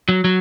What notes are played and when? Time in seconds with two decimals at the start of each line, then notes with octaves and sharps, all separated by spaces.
0.09 F#3
0.25 F#3